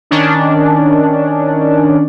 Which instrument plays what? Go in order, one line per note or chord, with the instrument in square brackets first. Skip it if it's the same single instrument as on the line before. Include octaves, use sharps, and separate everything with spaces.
[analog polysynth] D#3 C#4 D4